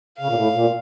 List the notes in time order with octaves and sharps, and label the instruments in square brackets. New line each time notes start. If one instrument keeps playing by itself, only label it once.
[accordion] C#3 [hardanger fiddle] F5
[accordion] A#2
A2
A#2